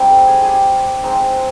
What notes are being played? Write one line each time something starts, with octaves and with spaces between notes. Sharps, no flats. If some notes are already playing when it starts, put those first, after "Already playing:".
Already playing: G3 C4 D#4
A4
G#4
G#4
G4
G#3 C4 D#4